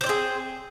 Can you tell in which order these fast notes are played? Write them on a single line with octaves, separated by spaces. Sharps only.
C4 D5 C5 G#4